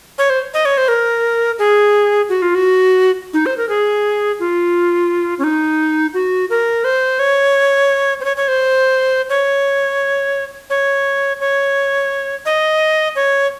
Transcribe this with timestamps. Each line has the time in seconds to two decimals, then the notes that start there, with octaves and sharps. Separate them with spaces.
0.18 C#5
0.30 C5
0.54 D#5
0.65 C#5
0.78 C5
0.88 A#4
1.59 G#4
2.29 F#4
2.42 F4
2.55 F#4
3.33 D#4
3.46 C5
3.57 A#4
3.69 G#4
4.40 F4
5.39 C#4
5.44 D#4
6.14 F#4
6.50 A#4
6.84 C5
7.19 C#5
8.21 C5
8.25 C#5
8.37 C#5
8.48 C5
9.29 C#5
10.70 C#5
11.40 C#5
12.46 D#5
13.16 C#5